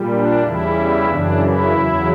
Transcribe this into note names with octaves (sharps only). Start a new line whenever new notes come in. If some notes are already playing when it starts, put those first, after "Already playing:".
Already playing: A#2 G3
D4
E2 C#3 E3 G3 E4
F#2 C#3 E3 D4
E4
E2 C#3 F#3